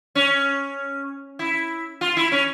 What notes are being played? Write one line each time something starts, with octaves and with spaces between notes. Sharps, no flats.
C#4
E4
F4
E4
C#4